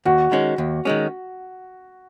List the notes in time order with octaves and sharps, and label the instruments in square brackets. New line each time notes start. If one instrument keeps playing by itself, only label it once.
[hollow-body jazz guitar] D#2 [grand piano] F#4
[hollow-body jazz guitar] D#3 G#3 C#4
D#2
D#3 G#3 C#4